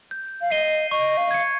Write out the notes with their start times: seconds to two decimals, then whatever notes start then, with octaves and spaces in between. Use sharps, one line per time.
0.11 G6
0.41 F5
0.51 D#5 C7 D#7 G7
0.91 D#5 C#6
1.17 F5
1.31 G#6 C#7